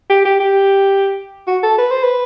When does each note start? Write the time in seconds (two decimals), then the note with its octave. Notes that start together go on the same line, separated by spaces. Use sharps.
0.10 G4
0.25 G4
0.40 G4
1.47 F#4
1.63 A4
1.78 B4
1.91 C5
2.03 B4